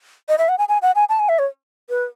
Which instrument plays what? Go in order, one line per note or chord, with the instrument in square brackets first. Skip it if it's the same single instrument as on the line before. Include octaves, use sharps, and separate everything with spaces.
[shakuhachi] D#5
E5
F#5
G#5
G#5
F#5
G#5
A5
G#5
E5
C#5
B4